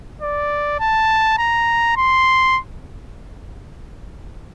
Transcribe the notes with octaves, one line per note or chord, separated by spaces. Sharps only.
D5
A5
A#5
C6